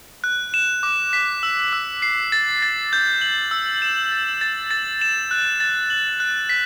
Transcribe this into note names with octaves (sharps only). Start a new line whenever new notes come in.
F#6
E7
D6
B6
E6
E6
C7
A6
A6
G6
F#7
E6
E7
A6
A6
A6
E7
F#6
A6
F#7
F#6
B6